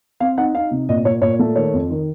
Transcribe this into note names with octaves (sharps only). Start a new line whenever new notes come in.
C4 F5
D#4 F#5
D#4 F5
C3
A#2 D#5
A#2 C#5
A#2 C#5
A3
D#3 C#5
F2
D#3